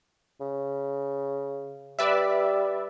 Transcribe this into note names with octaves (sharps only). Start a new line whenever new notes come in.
C#3
G3 B4 D5 E5